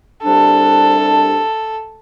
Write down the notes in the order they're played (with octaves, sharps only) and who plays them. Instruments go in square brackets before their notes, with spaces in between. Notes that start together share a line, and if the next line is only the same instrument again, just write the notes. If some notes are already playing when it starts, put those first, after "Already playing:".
[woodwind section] C2 C3 G3 D4 [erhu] A4